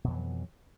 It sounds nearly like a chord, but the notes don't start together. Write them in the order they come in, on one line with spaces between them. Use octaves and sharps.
B2 F2 E3 F#3